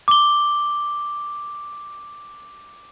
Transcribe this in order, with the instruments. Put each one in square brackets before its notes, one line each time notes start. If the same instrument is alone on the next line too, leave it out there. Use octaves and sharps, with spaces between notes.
[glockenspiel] D6 G7